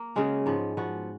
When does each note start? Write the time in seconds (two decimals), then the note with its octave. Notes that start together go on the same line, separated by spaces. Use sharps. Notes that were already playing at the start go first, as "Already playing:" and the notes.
Already playing: A#3
0.16 C#3 G#3 C#4 F#4
0.46 G#2 F3 B3
0.77 F3 B3 F#4